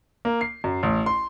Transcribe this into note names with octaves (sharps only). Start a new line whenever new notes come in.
A#3
C7
F#2
A1
C6